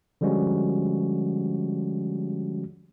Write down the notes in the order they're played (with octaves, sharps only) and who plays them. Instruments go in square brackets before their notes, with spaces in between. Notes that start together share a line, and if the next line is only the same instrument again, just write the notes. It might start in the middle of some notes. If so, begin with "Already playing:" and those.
[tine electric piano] D3 F3 G3 G#3 C#4 F#4